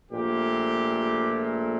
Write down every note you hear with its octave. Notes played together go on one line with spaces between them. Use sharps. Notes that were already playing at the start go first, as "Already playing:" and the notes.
A#1 A#2 A3 G4